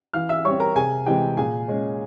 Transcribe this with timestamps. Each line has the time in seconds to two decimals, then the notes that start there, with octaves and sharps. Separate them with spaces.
0.13 E3 F5 F6
0.29 E5 E6
0.45 G3 C4 C#5 C#6
0.60 A#4 A#5
0.76 C3 G#4 G#5
1.06 E3 G#3 C4 G4 G5
1.37 A#2 G#4 G#5
1.68 G#3 C#4